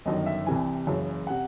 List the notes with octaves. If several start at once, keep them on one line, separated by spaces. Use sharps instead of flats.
G1 F#2 D#3 D#5
E5
C2 C3 E3 G#5
F#1 F#2 C#3 E3
C3 F#5